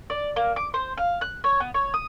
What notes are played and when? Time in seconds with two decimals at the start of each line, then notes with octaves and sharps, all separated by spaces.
0.10 D5
0.36 A#3
0.56 D6
0.74 C5
0.98 F5
1.21 F#6
1.44 C#5
1.60 B3
1.74 C#5
1.94 D#6